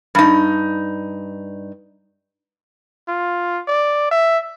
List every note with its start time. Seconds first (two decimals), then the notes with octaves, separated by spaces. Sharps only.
0.15 G2 D#4
3.08 F4
3.68 D5
4.11 E5